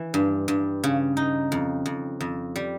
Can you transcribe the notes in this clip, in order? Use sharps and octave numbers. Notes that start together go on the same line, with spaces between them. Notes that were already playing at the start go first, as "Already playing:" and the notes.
Already playing: E3
G2
G2
C#3
D#4
F2
F2
F2
G3